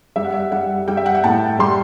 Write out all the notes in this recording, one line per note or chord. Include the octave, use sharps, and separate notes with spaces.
G3 E5
F#5
E5
G3 F#5
G3 G5
E5
F#5
G5
A2 A5
G3 C6